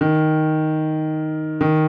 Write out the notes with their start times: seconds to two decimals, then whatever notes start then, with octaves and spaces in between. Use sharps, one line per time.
0.01 D#3
1.61 D#3